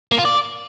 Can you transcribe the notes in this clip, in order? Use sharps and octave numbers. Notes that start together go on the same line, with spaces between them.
A#3
F4
D5